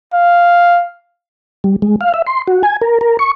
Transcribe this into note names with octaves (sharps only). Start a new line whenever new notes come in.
F5
G3
G#3
F5
E5
C6
F#4
G#5
A#4
A#4
C#6